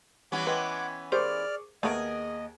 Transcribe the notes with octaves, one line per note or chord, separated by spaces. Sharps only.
E3 G3 B3 C#4 F#5 D6
B4 D#5 G5 C6
G4 G#4 A#4 C5 D5 C#6 D6 F6
D#2 A3 B3 G#4 A#4 D#5 D7